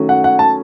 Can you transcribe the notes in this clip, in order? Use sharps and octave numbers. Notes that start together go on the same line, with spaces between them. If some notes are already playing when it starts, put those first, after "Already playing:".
Already playing: D#3 F#3 A3 C#4
F#5
F#5
A5